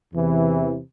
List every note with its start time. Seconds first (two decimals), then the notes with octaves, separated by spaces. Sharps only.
0.12 E2 C3 E3